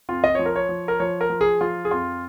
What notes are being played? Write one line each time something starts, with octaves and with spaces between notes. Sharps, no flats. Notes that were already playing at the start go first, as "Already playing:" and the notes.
F2 F4
D#5
F3 C#5
A#4
C#5
F3
A#4
F3 C#5
A#4
F3
G#4
F3 F4
G#4
F2 F4